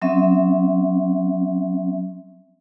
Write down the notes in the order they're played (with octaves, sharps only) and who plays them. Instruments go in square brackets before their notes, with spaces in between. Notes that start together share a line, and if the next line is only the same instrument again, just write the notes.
[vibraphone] F#3 C4 C#4 E5